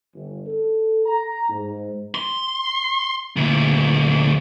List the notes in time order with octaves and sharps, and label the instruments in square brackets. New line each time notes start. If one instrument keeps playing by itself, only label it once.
[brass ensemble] G1
A4
A#5
G#2
[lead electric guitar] C6
D2 A#2